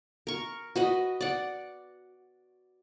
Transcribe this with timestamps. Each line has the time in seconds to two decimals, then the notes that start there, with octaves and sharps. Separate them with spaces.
0.27 A#4 C#6
0.76 F#4 B4 D#5
1.21 D5 F#5